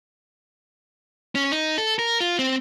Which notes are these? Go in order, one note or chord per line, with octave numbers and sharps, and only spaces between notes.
C#4
D#4
A4
A#4
F4
C4